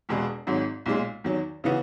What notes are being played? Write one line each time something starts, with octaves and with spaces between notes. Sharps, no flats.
E1 E2 B2 G#3
G#1 G#2 F#3
B1 A#2 G#3
E2 D#3 F#3
C#3 E3 B3 F#4